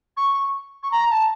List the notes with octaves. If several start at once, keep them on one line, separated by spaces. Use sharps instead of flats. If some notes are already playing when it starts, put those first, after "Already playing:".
C#6
C#6
A#5
A5